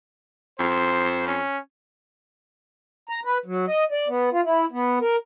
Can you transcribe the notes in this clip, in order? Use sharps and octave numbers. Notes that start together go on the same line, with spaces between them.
F2 C5
C#4
A#5
B4
F#3
D#5
D5
B3
F4
E4
B3
A#4